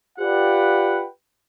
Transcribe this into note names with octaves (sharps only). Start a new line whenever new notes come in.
F4 G4 B4 D5 F#5 G5